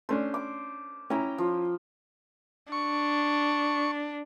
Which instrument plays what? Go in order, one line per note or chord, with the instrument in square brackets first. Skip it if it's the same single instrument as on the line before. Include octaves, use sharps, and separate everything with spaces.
[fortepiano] A3 C#4 D4 [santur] C5
[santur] D6
[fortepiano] C#4 E4 [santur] G5 A#5
[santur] F3
[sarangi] D4 [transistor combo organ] C#6